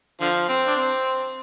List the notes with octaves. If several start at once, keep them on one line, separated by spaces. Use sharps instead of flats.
D3 F3
C4
D4
C4